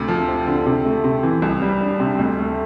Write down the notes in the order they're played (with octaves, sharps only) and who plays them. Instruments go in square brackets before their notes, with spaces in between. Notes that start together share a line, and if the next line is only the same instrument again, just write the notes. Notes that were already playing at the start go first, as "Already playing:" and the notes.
Already playing: [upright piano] D2 C3
F3
C4
D3
C3
A3
C3
E3
C2
G3
D4
C3
D2
A3